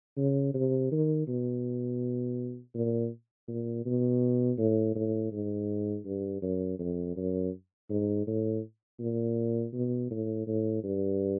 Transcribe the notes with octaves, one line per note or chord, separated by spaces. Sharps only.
C#3
C3
D#3
B2
A#2
A#2
B2
A2
A2
G#2
G2
F#2
F2
F#2
G#2
A2
A#2
B2
A2
A2
G2